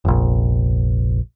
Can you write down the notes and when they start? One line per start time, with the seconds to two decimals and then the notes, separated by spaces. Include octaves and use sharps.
0.05 F1 A#1